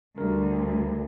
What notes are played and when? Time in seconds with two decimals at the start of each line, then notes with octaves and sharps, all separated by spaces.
0.18 D2 G3 A#4